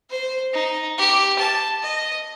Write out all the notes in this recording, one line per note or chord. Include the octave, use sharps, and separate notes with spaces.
C5
D#4
G4
A5
D#5